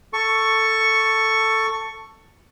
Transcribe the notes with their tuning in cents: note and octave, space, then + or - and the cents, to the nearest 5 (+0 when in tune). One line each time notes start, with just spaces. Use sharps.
A4 +10 C#6 +0